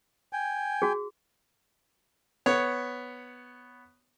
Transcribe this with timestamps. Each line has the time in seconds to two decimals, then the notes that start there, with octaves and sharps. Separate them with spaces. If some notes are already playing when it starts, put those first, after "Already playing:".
0.33 G5 G#5
0.82 F#4 G#4
2.46 B3 C#5